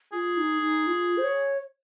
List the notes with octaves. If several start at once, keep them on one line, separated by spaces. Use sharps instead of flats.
F4 G#4
D#4
D#4
F4
C5
C#5